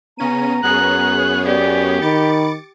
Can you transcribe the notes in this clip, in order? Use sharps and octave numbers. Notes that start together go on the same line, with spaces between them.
C#3 B3 C#4 A#5 D#7
F#2 B3 G#4 C#5 F#6
G4 D5
D#3 B5 D6 A6 C#7